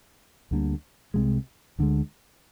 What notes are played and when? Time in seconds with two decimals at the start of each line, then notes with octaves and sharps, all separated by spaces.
0.51 D2 D3 G3 A#3
1.14 C2 C3 F3 G#3
1.79 D2 D3 G#3